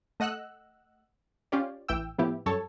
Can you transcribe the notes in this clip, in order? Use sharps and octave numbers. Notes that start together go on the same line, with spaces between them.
A3 D#5 F#5 E6 F#6
C#4 F4 G4 D5
A1 E3 G5 E6
A2 F3 B3 E4 G4
F#2 G3 A4 C#5 A5